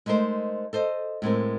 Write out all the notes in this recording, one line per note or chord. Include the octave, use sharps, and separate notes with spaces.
G#3 A3 D#4 A#4 C5
A4 C5 D#5
A2 G#3 C4 A#4